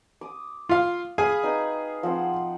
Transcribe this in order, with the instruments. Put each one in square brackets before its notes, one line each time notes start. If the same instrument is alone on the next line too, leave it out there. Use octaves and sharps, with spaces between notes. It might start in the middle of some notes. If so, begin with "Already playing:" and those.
[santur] D6 D#6
[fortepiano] F4 F5
[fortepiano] G#4 G#5 [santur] F5 B5 D#6
[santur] D#4 B4 G5
F3 C4 F#5